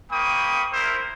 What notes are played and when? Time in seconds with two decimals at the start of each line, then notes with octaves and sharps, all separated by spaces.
0.11 A#3 C4 G5 B5 C#6 D#6
0.73 E4 A#4 C5